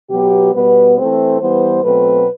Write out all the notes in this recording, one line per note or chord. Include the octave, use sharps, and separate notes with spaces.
B2 F#3 B3 G4
B2 G3 B3 B4
E3 A3 C4 C5
E3 G3 B3 C5
B2 F#3 A3 C4 B4